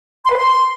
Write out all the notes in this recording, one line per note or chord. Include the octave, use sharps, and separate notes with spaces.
C6
B4
C6